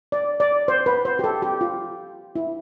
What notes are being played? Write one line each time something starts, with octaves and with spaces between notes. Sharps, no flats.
D5
D5
C5
B4
C5
G4
A4
G4
F4
E4